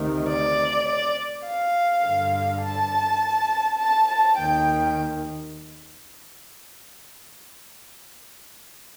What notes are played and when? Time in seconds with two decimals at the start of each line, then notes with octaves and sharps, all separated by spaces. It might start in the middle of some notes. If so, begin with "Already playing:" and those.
Already playing: D2 C3 D#3
0.29 D5
0.88 D5
1.46 F5
2.04 G2 D3
2.63 A5
3.79 A5
4.09 A5
4.38 D#2 D#3 G5